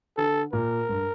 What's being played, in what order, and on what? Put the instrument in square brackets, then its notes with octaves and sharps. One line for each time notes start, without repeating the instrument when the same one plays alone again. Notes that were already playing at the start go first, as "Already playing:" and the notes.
[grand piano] D3 [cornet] A4
[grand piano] A#2 [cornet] A#4
[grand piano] G2